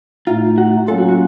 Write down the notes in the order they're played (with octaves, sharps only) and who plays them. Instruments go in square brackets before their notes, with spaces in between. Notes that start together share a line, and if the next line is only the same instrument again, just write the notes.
[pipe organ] A2 A3 D#4 [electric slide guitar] F4
[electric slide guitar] F#4
[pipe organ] F#3 A#3 C#4 F4 [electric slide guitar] A4
[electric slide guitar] F#4
F#4